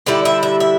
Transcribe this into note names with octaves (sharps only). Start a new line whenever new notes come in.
D3 G3 E4 D5
E5
E5
E5